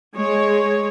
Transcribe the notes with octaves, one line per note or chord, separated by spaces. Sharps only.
G#3 C#5